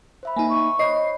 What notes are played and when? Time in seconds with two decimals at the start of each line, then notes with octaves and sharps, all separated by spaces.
0.23 C5 E5 B5
0.36 A#3 D#4 G#5
0.50 C#6
0.79 C5 C#5 D#5 B5 C7